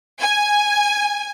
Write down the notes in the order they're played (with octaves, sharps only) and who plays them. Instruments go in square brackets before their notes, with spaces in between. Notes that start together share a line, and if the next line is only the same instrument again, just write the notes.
[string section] G#5